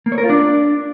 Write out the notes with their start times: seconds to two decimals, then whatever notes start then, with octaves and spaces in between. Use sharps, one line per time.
0.06 A#3
0.12 C#5
0.18 A#4
0.24 F4
0.30 D4